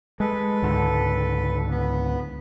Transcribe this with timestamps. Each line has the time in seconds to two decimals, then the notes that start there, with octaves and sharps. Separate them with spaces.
0.20 G#3 A4 B4
0.62 C#2 G#2 D3
1.70 B3